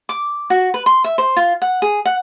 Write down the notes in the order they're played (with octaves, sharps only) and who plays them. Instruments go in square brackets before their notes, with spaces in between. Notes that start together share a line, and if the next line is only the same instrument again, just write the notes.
[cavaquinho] D6
F#4
B4
C6
E5
C5
F4
F#5
G#4
F#5